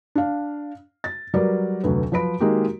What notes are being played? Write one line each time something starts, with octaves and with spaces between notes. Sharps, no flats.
D4 F5
A6
F#3 G3 F#4 A#4 B4 D5
F1 D2 F#3 B4
F3 F#3 B4 B5 D7
D#3 G#3 A#3 F#4 G4